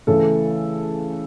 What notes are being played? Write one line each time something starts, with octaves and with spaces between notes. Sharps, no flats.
C#3 E3 A3 A4